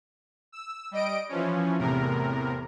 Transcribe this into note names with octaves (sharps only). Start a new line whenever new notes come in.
E6
G3 D#5 D7
E3 F3 C#4
E2 A2 C3 A#4